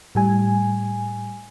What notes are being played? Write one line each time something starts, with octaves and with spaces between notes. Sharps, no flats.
A2 G3 G#5